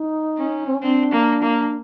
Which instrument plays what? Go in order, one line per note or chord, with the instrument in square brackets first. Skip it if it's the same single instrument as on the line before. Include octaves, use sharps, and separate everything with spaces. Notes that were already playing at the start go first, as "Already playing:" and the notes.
Already playing: [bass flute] D#4
[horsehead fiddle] C#4
[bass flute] C4
C#4
[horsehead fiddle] C4 [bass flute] D4
[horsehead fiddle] A#3
A#3